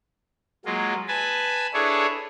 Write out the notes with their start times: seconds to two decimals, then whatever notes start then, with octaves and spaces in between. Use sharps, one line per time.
0.66 F#3 G#3 A#3 F4
1.08 B4 G#5 A5 B5
1.74 D4 E4 G#4 A4 B4 C#5